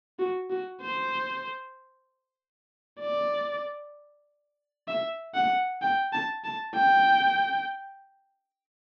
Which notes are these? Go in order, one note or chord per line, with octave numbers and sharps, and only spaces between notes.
F#4
F#4
C5
D5
E5
F#5
G5
A5
A5
G5